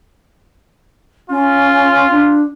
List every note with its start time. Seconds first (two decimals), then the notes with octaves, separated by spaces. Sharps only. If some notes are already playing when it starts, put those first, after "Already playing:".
1.30 C#4 F4
2.11 D4